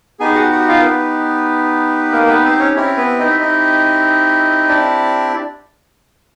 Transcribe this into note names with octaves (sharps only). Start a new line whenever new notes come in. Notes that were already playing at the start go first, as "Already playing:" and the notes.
B3 D#4 G4 G#4 G#5
F#4 F#5
F#4 F#5
F4 F5
A#4
B3 B4
A#3 A#4
B3 B4
C4 C5
C#4 C#5
C4 C#4 E4 G4 C#5
B3 B4
D#4 D#5
E5
D#4 D#5
D4 D5